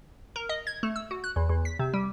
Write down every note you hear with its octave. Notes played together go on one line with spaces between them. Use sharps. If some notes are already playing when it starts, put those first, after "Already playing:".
A#4
D#5
G#6
A3
E6
F#4
F#6
E2
E2
B6
C3
G3